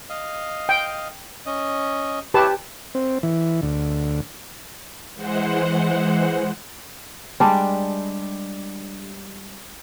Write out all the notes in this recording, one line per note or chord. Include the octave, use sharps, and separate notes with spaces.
D#5 F5
G5
C#4 D#5
E4 G4 B4 C#5 A5
C4
E3
D2
E3 G#3 C5 F#5
G3 G#3 D4 G4